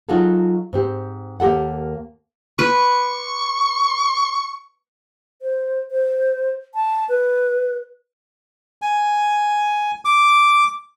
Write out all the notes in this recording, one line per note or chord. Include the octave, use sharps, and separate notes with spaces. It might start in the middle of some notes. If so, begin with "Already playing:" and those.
F#3 D#4 F4 F#4 G#4 A4
G#2 C4 G4
D#2 A#3 G4 A4 F#5
B4 C#6
C5
C5
A5
B4
G#5
D6